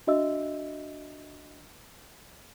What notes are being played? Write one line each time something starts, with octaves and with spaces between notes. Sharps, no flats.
D4 F#4 D#5 E5 E6